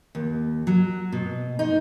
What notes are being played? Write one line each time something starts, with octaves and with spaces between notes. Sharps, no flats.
D#2
F#3
B2
D#4